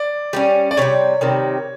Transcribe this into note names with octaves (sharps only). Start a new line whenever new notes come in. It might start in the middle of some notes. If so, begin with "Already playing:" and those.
Already playing: D5
G3 A#3 C#4
D5
C3 D#3 G3 C#5
C3 D#3 G3